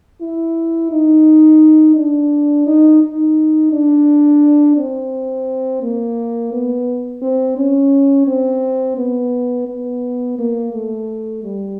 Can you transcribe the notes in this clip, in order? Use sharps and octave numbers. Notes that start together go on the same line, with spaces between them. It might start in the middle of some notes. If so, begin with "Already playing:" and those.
E4
D#4
D4
D#4
D#4
D4
C4
A#3
B3
C4
C#4
C4
B3
B3
A#3
A3
G3